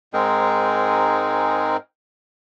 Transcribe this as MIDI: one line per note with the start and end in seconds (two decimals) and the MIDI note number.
0.13 1.77 44
0.13 1.77 56
0.13 1.77 60
0.13 1.77 63
0.13 1.77 68
0.13 1.77 70